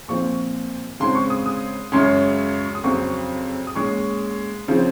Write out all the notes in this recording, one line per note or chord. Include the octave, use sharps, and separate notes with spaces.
A#2 F3 C4 C#6
C#3 G#3 C4 C6
C#6
D#6
D#6
F#2 C#3 G#3 C#4 C6
D#6
F2 C#3 F#3 C4 C#6
D#6
A#2 G#3 C#4 C#6
C#3 F3 C4